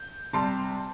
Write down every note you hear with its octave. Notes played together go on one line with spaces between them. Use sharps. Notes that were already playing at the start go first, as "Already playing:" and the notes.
Already playing: G6
C3 G3 A5 C6